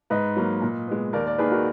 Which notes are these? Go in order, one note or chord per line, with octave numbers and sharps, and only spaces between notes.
G#2 B4 D#5
F#3 A#3
A#2
G#3 B3
D#2 A#4 D5
A#4 D5
D#3 A#3 G#4 B4
F#4 A#4